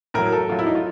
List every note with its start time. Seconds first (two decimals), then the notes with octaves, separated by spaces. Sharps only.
0.14 A2 F#3 A#4
0.32 A4
0.49 A2 F#3 F4
0.59 E4
0.66 D#4
0.75 F4